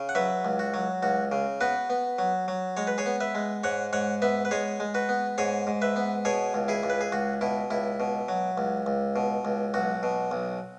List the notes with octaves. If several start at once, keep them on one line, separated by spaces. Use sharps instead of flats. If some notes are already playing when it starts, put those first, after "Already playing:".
Already playing: C#3
F#5
F#3 B4 E5
C#2
F#4
F#3
C#2 F#4
C#3
B3 F#4 B4
B3
F#3
F#3
G#3 C#5
B4
G#4 C#5
B3
B4 E5
G#3
G#2 C#5 F#5
G#2 C#5 F#5
B3 B4 E5
B4
G#3 G#4 C#5
G#3
F#4 B4
B3
G#2 G#4 C#5
G#2
B4 E5
B3
B2 G#4 C#5
C#2
E4 G#4
C#2
B4
G#4
C#2 F#4
B2 E4
C#2 E4
B2
F#3
C#2
C#2
B2
C#2
B1 F#4
B2
B1